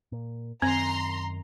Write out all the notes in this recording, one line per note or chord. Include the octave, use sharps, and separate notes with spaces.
A#2
F#2 D#3 C4 A#5 C6